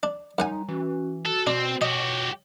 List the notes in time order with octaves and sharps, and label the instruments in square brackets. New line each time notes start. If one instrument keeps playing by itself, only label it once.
[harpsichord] D4
[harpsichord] F#2 F#5 G#5 [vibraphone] G3 A#5 C6 [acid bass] D#4
[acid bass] E3 [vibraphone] C#4 F#4
[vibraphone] F#4 [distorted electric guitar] A4
[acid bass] B2 [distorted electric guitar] C4 [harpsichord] D4
[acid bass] B2 [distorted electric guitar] F#4 G4 [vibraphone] C#5 [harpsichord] D#5